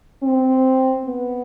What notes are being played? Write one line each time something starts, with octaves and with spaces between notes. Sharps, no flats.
C4
B3